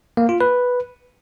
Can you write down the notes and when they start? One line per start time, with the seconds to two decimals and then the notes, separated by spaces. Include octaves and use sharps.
0.17 A#3
0.29 F4
0.41 B4